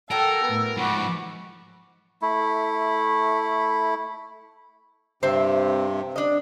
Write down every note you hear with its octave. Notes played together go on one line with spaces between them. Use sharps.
F#3 A4 A#4 G5 E6
A2 B3
G#2 F3 F#5 B5 C#6 D6
A3 E4
G2 C3 C4 E5
D4 D#5